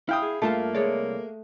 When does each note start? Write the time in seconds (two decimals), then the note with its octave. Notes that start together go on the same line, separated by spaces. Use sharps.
0.09 E4 F5 G5 D#6
0.22 G#4
0.42 G2 A3 A#3 F4 A5
0.75 C2 G#3 C#5 D5